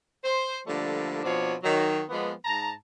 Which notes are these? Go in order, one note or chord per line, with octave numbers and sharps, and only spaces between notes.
C5
D3 F3 G3 A3 A#3
B2 F3 C4 D4 C#5
D#3 F#3
F3 G#3 A#3 B3
G#2 A5 A#5